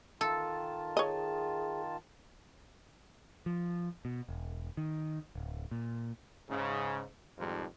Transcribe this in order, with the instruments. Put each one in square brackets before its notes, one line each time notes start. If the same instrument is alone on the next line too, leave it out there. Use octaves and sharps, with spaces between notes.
[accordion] D#3 F4 A5 [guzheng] A4
[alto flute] G#4 [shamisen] C#5 D#5
[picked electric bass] F3
B2
E1
D#3
D1
A#2
[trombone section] G#2 C#3
F2 G#2 D#3 F3 G3